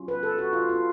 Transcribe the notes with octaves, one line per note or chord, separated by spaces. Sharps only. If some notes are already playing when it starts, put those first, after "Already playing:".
Already playing: F#3 C#4 F4
B4
A4
F#4
F4
F4